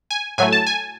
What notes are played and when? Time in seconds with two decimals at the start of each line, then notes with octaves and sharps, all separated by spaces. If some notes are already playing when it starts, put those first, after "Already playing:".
0.11 G#5
0.38 A2 F#3 A3 G#5
0.52 A5
0.67 G#5